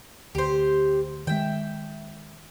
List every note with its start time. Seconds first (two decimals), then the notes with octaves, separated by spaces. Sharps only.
0.35 D2 G4 C5
1.27 D#3 G#3 E5 G5